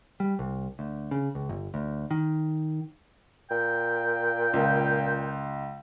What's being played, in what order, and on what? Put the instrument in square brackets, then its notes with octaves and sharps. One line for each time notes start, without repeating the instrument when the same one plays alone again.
[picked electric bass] G3
C2
D2
C#3
C#2
G1
D2
D#3
[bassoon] A#2 [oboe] G5
[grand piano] C#2